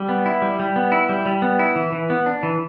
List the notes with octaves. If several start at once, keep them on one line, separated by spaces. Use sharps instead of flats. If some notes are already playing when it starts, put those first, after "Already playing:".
Already playing: G3
B3
E4
G3
G3
B3
E4
G3
G3
B3
E4
E3
E3
B3
D4
E3